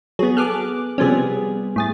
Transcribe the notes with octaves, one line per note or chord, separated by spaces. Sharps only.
F#3 B3 G#4
G#4 A4 D6 F6 F#6
C3 F3 G3 B3 C#4 G#4
A2 G#4 A6